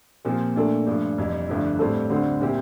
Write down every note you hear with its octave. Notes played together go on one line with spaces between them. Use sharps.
A#2 F3 C4 G4
A#2 A3 D4 F4 A4
G2 F3 A3
F1 F2 E3 G3
G1 G2 F3 A3 E4
A2 G3 C4 F4 A4
D2 D3 G3 C4
A#2 G3 C4 E4 G4